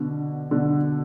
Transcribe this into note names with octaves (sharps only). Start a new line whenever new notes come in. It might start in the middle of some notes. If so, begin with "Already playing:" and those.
Already playing: B2 D3
B2 D3